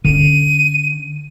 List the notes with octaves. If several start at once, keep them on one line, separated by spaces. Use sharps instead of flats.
D3 C#4 D#7